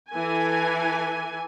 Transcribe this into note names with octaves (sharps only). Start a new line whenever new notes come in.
E3 A4 G#5